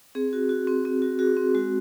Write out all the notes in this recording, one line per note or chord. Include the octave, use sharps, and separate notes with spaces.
C4 G#4
F#4
F#4
C4
C4
F#4
F#4 G#4
C4
G#3 F#4